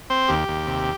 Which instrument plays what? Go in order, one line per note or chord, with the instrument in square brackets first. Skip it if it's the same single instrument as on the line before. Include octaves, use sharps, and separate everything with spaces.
[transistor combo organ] C4 C5
D#2 G4
D#2
C3